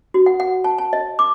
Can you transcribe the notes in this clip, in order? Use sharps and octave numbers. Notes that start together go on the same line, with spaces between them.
F#4
F#5
F#5
A5
A5
D#5
D6